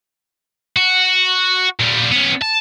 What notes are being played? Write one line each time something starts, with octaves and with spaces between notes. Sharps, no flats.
F#4
A#2 G3
B3 C#4
A5